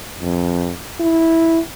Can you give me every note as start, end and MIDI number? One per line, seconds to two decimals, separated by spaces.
0.21 0.72 41
1.00 1.59 64